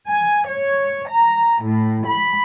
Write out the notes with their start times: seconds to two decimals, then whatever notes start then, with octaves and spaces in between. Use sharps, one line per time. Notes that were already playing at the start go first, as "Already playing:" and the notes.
0.10 G#5
0.47 C#5
1.09 A#5
1.63 A2
2.04 B5